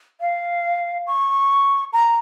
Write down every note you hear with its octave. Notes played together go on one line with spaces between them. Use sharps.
F5
C#6
A#5